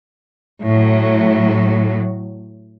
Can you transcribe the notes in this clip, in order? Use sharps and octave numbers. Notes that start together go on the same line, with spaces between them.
A2 F#3